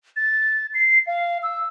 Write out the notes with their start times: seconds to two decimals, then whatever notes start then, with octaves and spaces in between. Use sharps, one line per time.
0.16 A6
0.74 C7
1.07 F5
1.43 E6